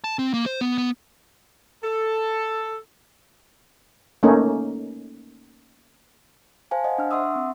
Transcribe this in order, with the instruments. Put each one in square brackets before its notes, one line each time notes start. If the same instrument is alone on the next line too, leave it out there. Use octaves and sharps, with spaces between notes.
[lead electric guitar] A5
C4
A#3
C5
B3
B3
[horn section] A4
[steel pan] A3 A#3 C#4 D#4
[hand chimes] C5 F5 G#5 A5
C5 D#5 F#5
D4 F6
E5 F#5 C6 C#6 D#6 E6
C4